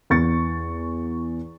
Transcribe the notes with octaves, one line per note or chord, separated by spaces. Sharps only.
E2 C#6 A6 C#7